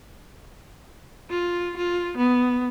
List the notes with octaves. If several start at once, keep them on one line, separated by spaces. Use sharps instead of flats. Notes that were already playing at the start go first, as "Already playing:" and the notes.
F4
F4
B3